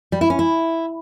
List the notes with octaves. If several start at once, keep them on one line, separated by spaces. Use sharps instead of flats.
G3
E4
C#4
E4